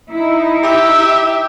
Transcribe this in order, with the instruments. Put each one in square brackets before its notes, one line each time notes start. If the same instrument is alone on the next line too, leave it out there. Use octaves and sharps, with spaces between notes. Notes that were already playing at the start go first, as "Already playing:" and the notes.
[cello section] D#4 E4
[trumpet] G4 [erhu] E5